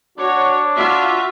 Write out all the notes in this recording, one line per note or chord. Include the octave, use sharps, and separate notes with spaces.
D4 F#4 C#5
F4 F#4 E5